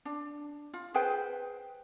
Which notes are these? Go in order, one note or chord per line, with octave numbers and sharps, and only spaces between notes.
D4
F4
G#4 B4 C5 G5